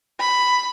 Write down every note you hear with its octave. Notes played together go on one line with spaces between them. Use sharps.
B5